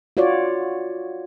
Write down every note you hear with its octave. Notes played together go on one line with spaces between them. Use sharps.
F4 F#4 C#5 D5